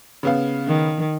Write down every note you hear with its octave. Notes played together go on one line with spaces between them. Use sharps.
C#3 B3 F5
D#3